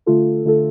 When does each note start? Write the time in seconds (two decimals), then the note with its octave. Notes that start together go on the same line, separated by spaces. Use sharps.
0.06 D3 A3 F4 A4
0.45 D3 A3 F4 A4